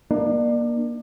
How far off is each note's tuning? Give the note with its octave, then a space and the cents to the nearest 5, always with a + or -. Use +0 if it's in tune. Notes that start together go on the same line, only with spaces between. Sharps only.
A#3 +25 D4 +30